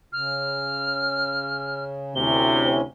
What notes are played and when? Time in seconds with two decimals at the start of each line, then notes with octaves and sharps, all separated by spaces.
0.13 C#3 F6
2.16 D2 C3 E3 C#4 G7